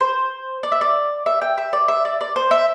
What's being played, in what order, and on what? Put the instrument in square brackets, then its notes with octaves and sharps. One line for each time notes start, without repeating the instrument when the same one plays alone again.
[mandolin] C5
D5
E5
D5
E5
G5
E5
D5
E5
D5
D5
C5
E5